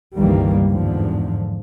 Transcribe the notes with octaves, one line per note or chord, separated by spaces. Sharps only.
G1 C#2 D#3 E3 G3 A#3
E2 G#2 D3 F3